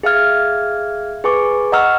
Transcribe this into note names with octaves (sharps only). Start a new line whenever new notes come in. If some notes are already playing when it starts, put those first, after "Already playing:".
G#4 E5 F5 F6 G#6
G#4 B4 G#5 C#6 D6
D#5 F#5 A#5 C#6 E6 F6